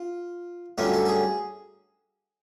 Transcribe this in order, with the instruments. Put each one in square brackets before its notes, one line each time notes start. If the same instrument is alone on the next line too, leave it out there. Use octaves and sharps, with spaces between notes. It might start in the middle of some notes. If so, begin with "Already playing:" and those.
Already playing: [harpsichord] F4
G2 D3 F#3 A3 C#4 F4
A4
A4
G#4